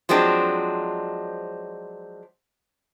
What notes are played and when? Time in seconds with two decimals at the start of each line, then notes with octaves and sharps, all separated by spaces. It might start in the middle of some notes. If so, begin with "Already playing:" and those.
0.09 F3 F#3 G#3 C4 D4